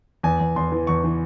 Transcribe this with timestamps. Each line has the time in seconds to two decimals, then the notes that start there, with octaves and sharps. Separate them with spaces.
0.23 E2 G#5
0.40 E2
0.56 E2 C6
0.72 E3
0.87 E2 C#6
1.04 E3